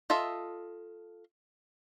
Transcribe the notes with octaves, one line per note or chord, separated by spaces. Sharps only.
F4 A4 D#5 E5